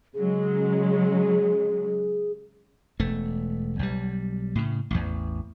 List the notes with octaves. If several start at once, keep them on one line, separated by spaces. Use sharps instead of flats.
C#3 F#3 G#3 G#4
E1 A3
B1 G3
A2 C#3
A1 E2